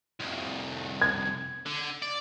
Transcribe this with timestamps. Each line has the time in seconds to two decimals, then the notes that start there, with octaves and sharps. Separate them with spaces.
0.20 C2 F2
1.02 G#6
1.66 D3
2.02 D5